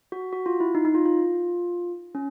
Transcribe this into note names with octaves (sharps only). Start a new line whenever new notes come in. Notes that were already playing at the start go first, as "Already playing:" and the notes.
F#4
F#4
F4
E4
D#4
D#4
F4
F4
C#4